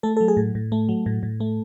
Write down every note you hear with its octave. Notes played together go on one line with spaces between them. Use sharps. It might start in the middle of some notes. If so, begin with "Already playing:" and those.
A3 A4
F#3 A4
G#4
A2
A2
A3
F#3
A2
A2
A3